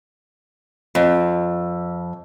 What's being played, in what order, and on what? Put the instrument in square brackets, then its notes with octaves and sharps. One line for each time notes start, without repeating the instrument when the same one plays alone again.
[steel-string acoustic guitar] F2